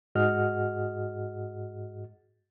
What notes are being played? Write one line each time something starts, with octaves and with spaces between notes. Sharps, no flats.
G#2 F#4 G#4 D#5 F#5 F6